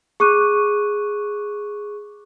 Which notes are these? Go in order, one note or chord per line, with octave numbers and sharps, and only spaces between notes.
G#4 C#6 D6 F#6 D#7